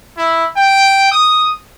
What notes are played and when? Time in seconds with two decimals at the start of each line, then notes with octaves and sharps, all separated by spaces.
0.17 E4
0.57 G5
1.12 D#6